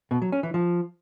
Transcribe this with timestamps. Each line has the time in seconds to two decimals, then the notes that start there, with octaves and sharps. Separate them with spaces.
0.11 B2
0.22 F#3
0.32 C#4
0.43 E3
0.54 F3